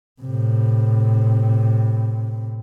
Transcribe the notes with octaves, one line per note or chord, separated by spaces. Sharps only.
A2 C3